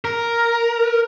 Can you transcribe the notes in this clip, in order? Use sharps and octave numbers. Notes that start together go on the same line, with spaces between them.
A#4